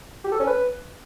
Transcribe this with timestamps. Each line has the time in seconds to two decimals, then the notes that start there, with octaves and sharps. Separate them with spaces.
0.24 G4
0.32 A4
0.40 C#4
0.47 B4